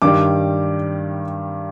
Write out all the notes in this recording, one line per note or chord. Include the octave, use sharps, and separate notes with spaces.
G2 D#3 G3 D6